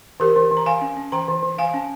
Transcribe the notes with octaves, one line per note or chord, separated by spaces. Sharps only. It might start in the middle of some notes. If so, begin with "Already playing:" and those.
E3 G4 A#4
E3
E3
A#5
E3 F5 G#5
C#4
C#4
E3 G5 A#5
E3
E3
E3 F5 G#5
C#4